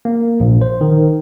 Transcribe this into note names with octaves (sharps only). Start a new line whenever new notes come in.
A#3
A#1
C5
D#3